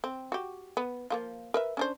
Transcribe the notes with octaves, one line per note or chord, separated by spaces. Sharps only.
C4
F#4 G4
B3
F3 A#3 F4
A#4 B4 E5
C#4 D4 C5